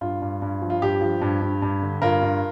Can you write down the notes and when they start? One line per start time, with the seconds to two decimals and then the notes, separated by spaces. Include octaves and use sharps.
0.01 G2 F4
0.22 G2
0.42 G2
0.62 F3
0.70 F4
0.82 G2 G4
1.01 F3
1.22 G2
1.42 G2
1.62 G2
1.82 D3
2.02 G2 F4 A#4
2.22 G2